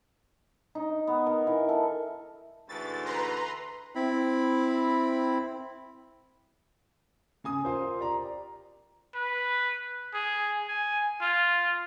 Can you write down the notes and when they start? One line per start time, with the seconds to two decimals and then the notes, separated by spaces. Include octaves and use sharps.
0.75 D#4
1.07 B3
1.26 A#4
1.47 E3
1.69 A4
2.69 D2 G#2 E3 A6
3.05 B4 A#5 C6
3.95 C4 E4 B5
7.44 C#3 G#5 D#6
7.65 F4 A#4 C5
7.99 G4 D5 A#5
9.15 B4
10.14 G#4
10.68 G#5
11.21 F4